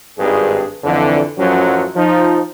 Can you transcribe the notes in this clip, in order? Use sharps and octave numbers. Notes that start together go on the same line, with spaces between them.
G#1 G2 G#4
F2 D3 E3
A1 F#2 F3 F#3 C#4 F#4
F3 D#4